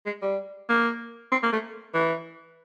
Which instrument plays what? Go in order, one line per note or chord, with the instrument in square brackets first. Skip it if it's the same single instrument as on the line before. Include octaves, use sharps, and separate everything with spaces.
[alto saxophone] G#3
G3
A#3
C4
A#3
A3
E3